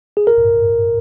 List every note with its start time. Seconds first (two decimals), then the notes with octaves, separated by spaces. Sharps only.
0.17 G#4
0.27 A#4